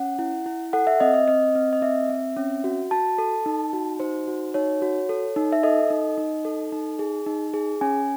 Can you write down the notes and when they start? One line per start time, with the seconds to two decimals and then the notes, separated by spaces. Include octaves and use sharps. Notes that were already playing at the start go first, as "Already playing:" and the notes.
Already playing: C#4 F#5
0.19 E4
0.46 E4
0.73 A4 F#5
0.87 E5
1.00 C4 D#5
1.14 D#5
1.28 C4 D#5
1.55 C4
1.73 D#5
1.82 C4 E5
2.10 C4
2.37 C#4
2.64 F#4
2.91 F#4 A5
3.18 A4
3.46 D#4
3.73 F#4
4.00 D#4 C5
4.28 F#4
4.54 D#4 C#5
4.82 F#4
5.09 A4
5.36 D#4
5.52 E5
5.63 A4 D#5
5.90 D#4
6.18 D#4
6.45 A4
6.72 D#4
6.99 G#4
7.26 D#4
7.54 G#4
7.81 C#4 G#5